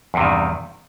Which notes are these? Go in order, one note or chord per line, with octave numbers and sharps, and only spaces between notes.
E2 G2 C3 D#3